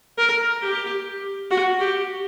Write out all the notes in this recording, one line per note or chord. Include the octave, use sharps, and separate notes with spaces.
A#4
G4
F#4
G4